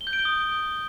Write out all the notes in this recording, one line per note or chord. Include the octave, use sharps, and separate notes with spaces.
G7
G6
D7
G7
D#6